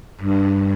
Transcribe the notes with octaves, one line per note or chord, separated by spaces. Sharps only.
G2